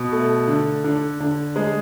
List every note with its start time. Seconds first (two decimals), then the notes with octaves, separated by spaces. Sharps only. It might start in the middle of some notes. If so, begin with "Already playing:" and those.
Already playing: B2
0.12 A3
0.48 D3
0.84 D3
1.20 D3
1.56 G#3